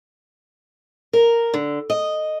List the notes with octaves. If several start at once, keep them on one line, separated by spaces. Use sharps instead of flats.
A#4
D3
D#5